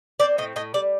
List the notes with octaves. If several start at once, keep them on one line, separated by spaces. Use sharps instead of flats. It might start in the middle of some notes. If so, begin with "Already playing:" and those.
C4 D5
A2 D#5
A2 D#5
G3 D5